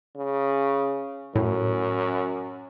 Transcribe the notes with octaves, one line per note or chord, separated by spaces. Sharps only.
C#3
F#2 A2